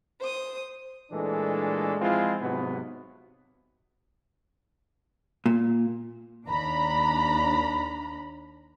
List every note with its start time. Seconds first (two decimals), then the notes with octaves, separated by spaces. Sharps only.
0.21 C5 D#6
1.11 A#2 E3 G#3 A3 D4 A4
2.01 F3 G#3 C4 E4 F4
2.41 G#2 C3 F#3 B3
5.46 A#2
6.47 D#2 D4 A#5 B5